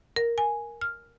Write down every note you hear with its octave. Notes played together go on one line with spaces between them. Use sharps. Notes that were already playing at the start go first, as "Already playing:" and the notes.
A#4
G#5
F6